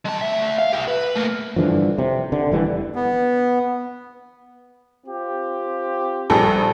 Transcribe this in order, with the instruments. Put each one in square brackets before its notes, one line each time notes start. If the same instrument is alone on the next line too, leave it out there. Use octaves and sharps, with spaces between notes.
[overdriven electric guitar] G#3 A5
D2 E5
F5
E4 G4
B4
A3 A#3
[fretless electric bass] G2 D3 E3 F3
C3
D3
F1 E3 G3 D4
[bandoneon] B3
[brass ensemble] C4 F4 G4
[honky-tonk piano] A#1 G3 G#4 [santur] A4